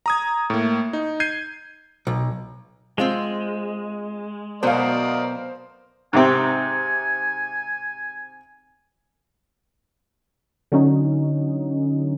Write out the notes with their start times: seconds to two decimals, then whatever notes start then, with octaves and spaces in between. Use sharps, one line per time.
0.06 A#5 D#6 G#6
0.50 A2 A#3
0.93 D#4
1.20 G6 G#6 C7 D#7
2.07 B1
2.98 G#3 C4 F4 C5
4.63 B2 F#3 B3 A#4 C5 D5 D#5 F5
6.13 G#2 C3 C4 G#5
10.72 D3 F#3 C#4 D#4